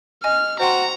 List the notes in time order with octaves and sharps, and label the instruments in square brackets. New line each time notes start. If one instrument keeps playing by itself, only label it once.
[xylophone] D#5 G#5 [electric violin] F6
[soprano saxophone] F#4 [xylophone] C5 G5 C6 [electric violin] A#5